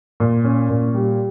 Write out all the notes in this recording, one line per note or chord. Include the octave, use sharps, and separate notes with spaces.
A#2
C#4
A#2
G3